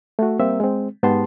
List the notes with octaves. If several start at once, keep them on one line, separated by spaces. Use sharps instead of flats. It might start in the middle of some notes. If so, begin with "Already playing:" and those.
A3 F#4
G3 A#3 C4 A#4 E5
G#3 C4
G#2 B3 G4 A5 C6